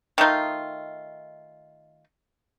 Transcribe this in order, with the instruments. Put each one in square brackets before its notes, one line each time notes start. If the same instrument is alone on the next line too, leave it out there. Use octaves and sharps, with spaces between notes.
[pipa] D#3 A3 D#4 F4